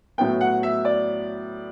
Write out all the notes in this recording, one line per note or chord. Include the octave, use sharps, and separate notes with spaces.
A2 F#3 B3 G5
F#5
E5
D5